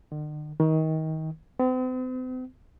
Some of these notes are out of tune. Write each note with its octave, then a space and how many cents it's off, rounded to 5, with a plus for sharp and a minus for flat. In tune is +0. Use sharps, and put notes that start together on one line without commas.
D3 +45
D#3 +25
C4 -45